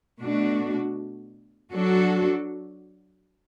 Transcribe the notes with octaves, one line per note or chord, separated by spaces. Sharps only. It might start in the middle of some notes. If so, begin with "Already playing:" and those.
B2 A3 D4 F#4
F#3 D4 F#4 A4